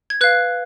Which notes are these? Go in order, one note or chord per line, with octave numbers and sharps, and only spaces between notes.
G#6
B4 F5 F#6